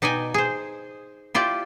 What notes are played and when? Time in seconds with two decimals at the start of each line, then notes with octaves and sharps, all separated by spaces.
0.02 B2 D#4 D5 G5 G#5
0.34 G#4 C5
1.35 E4 F4 G4 D5